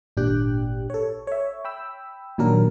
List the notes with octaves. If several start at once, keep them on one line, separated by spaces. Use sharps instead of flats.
G#1 A#2 D4 G4 G5 F#6
A4 C#5
C#5 E5
G5 B5 E6
A#2 D#3 F#3 D4 G4 A#4